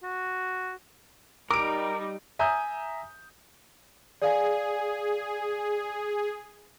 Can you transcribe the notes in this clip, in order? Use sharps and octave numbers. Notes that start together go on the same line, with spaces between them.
F#4
G3 D#4 A#4 D6 D7
E5 G#5 A#5 D#6 G6
G#4 D5 F5 G#5